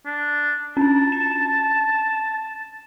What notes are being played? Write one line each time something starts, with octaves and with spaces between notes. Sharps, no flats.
D4
C#4 D4 A5
A6 E7